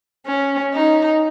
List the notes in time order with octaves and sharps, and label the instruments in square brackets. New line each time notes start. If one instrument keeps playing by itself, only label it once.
[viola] C#4
D#4